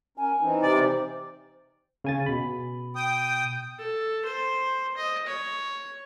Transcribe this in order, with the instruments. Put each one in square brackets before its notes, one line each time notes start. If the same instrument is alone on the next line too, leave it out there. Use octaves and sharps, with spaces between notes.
[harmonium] C#4 A#4 [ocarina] G#5
[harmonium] E3 C4 D#4
[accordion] C3 D5 [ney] C5
[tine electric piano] C#3 G#5 A6
B2 B5
[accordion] G5 D#6
[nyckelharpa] A4
C5
D#5
C#5